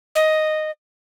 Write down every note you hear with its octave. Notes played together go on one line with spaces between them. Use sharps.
D#5